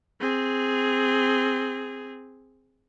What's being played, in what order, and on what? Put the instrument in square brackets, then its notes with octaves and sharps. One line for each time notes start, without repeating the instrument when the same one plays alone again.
[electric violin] C4 G#4